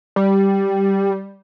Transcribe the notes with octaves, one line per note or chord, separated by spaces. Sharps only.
G3